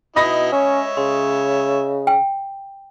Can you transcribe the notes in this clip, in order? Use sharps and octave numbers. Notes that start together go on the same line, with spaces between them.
B2 D#4 E4 D#5 B5 A#6
C#4 C#5 E5
C#3 C6
G5